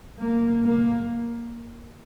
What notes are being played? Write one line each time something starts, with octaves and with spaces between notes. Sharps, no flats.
A#3
A#3